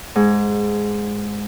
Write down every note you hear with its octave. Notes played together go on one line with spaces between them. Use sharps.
G#2